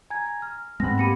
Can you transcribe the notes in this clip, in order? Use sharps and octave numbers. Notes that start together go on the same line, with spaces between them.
G#5 A#5 G#6
F6
G#2 G#3 B3 C4 B5 A#6
A#3 G4 B5 C#7 D#7